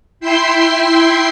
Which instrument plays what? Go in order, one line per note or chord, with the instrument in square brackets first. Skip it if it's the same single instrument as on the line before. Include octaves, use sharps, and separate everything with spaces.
[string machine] E4 E5 G5 C6 C7